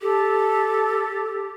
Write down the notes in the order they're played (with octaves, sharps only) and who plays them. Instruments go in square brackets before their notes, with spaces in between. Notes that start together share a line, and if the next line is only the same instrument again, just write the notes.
[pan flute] G4 [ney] A4